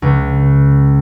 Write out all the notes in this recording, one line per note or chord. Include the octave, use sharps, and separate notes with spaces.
C#2